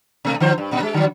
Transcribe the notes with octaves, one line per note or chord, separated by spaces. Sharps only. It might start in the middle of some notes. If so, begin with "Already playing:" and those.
B2 A3
D3 F3 C5
G2
G2 A#2
G#3
D3 F#3